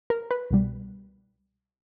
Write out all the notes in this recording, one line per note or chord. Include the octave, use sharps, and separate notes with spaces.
A#4
B4
C2 B2 G3